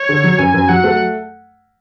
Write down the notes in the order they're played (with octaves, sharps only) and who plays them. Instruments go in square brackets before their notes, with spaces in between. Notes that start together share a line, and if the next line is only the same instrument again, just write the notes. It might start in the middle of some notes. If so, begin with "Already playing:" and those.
Already playing: [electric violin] C#5
[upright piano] D3
F#3
[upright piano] F#2 [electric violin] G#5
[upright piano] F#2
[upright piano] F#3 [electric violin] F#5
[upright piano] A3